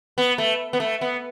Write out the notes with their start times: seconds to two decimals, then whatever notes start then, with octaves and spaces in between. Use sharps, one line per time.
0.18 B3
0.38 A3
0.73 B3
0.80 A3
1.01 B3